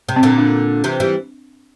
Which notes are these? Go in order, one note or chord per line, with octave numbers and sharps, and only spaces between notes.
C3
C4
A#2 D3
D4
C3 E3
E3 G3